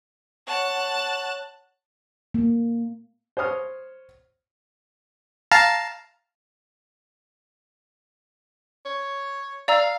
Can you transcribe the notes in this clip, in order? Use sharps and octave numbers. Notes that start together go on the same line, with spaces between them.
C#5 F#5 A5 C#6 F#6
A#3
C5 C#5 D#6 F6
F5 A5 A#5
C#5
D5 F5 A#5 E6